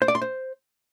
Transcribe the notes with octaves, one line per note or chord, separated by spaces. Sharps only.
C5
D5
C6
C5